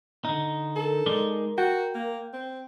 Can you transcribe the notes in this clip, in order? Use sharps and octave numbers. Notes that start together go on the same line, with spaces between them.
D3 D#4
A4 A#4
G#3 D#4 D5
F#4 G5
A#3
C4